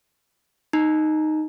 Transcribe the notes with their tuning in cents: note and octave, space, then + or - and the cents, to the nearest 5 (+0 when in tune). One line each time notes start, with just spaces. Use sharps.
D#4 -5 A#5 +0